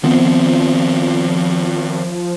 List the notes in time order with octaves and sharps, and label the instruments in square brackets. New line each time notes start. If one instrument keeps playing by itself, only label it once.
[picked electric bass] D#3 B3 C4 [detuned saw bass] F3